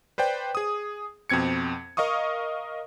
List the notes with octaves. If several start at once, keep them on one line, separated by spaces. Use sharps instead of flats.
B4 C5 D5 G5
G#4 D#6
F2 B2 C4 G#6 C#7
A#4 D#5 F5 C#6 D#6